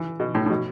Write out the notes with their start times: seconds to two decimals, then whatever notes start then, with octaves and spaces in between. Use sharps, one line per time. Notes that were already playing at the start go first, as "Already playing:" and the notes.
Already playing: E3
0.20 B2
0.35 A2
0.46 A2
0.50 B2